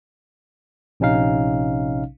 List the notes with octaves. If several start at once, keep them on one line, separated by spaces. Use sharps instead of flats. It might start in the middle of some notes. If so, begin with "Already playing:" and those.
A#1 C3 C#4 D#4 F5